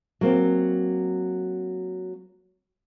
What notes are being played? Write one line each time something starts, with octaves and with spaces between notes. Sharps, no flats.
F#3 A#3 C4